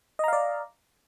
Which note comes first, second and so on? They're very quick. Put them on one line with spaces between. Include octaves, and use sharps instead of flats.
D#5 A#5 F5 D5